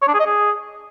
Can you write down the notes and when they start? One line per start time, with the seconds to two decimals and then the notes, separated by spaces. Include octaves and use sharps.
0.02 C#5
0.08 D4
0.14 G#4
0.20 D#5
0.26 G#4